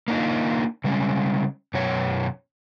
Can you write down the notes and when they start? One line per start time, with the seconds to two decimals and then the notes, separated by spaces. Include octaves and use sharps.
0.08 A#3 D4 D#4 F4
0.84 C#3 G3 G#3 C#4
1.74 F#2 B2 C#5